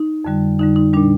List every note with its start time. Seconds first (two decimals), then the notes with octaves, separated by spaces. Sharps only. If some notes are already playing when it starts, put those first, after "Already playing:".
Already playing: D#4
0.24 F2 D3 G3
0.59 F2 D3 G3 D#4
0.76 D#4
0.93 G3 D4
0.97 A#2